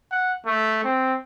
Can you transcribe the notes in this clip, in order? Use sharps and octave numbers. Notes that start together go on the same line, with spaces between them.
F#5
A3
C4